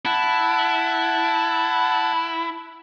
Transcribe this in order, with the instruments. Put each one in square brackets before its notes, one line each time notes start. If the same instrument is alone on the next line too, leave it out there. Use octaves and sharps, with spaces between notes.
[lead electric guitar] E4 [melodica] F#5 A5